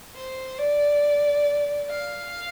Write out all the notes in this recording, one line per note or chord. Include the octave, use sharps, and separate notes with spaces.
C5
D5
F5